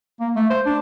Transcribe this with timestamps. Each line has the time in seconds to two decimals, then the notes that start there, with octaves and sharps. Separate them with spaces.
0.20 A#3
0.35 A3
0.50 C5
0.66 D4